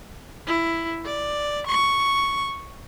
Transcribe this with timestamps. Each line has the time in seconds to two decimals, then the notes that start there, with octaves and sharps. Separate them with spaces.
0.47 E4
1.05 D5
1.67 C#6